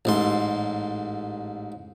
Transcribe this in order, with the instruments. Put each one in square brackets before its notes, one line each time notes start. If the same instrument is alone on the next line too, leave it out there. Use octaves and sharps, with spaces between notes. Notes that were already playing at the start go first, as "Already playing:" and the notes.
[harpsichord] A1 G#2 C6